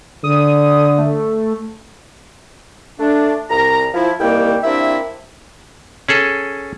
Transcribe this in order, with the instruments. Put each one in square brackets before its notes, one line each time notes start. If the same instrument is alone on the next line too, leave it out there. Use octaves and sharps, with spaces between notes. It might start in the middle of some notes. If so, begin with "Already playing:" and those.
[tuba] D3 [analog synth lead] D#6
[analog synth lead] A3
[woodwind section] A3 D4
C2 A#5
F3 E4
C2 D#3 G3 A#3 E4 G5
G3 A#3 C4 D4 E4 E5
[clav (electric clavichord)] C#4 G#4 A4